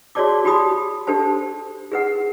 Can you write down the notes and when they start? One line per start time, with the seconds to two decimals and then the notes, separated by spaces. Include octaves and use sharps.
0.15 F#4 G#4 C#5 D5 A5 D6
0.45 F#4 G4 G#5 A5 B5 D#6
1.07 D4 G4 A4 C5 A5
1.92 G#4 B4 F#5